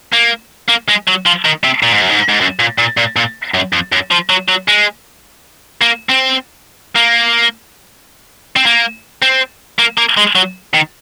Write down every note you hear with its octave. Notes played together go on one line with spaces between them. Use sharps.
A#3
A#3
G#3
F#3
F3
D#3
C3
A#2
G#2
F#2
G#2
G#2
F#2
A#2
A#2
A#2
A#2
F#2
F2
F#2
F3
F#3
F#3
G#3
A#3
C4
A#3
C4
A#3
C4
A#3
A#3
G#3
F#3
D#3